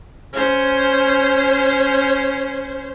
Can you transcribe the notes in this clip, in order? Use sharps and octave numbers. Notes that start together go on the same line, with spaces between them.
C#4 C5